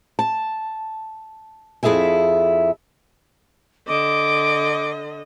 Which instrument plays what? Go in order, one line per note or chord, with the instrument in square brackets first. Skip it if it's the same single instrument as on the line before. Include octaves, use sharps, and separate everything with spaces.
[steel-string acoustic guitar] A5
F2 E4 G#4 A4 E5 G#5
[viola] D3 D#5 [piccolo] D6